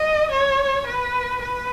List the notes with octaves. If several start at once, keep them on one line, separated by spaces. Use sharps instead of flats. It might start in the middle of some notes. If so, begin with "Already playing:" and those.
Already playing: D#5
C#5
B4
B4